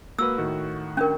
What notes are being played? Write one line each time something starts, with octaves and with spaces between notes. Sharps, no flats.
A#3 F#4 B4 E6
A2 D#3 F#4
C#4 D4 A#4